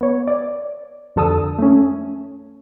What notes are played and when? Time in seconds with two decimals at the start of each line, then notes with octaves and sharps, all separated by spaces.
0.01 B3 C#5
0.28 D5
1.16 F2 D3 A4 A5 D#6 E6
1.59 A3 C#4